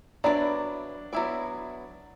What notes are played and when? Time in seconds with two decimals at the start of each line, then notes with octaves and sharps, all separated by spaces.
0.24 F#3 B3 D4 E4 B4 D5
1.13 F#3 B3 E4 B4 D5